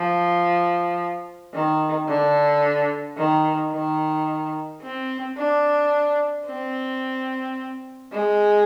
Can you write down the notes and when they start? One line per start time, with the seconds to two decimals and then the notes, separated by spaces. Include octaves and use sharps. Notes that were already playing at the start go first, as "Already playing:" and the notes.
Already playing: F3
1.54 D#3
2.08 D3
3.17 D#3
3.72 D#3
4.81 C4
5.37 D4
6.46 C4
8.11 G#3